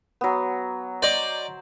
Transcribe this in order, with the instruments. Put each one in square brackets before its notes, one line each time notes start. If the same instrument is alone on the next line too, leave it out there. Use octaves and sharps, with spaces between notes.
[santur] F#3 B3
[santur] C5 [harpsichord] D5 D#5